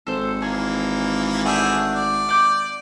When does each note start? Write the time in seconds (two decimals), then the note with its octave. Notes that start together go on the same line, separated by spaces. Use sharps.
0.07 G#1 A4 C5
0.42 E3 A#3 G#4
1.45 E3 A3 D4 G#4 F#5 E6 F#6 G6
1.95 D5
2.29 D6 G6 D7 F#7